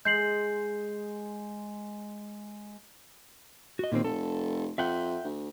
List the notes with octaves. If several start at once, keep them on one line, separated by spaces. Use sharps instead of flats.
G#3 G6 C7 F#7
F#4 D#5
D#2 A#2 D#3 C4
F1 A4
F2 E5 F#5 G5
D2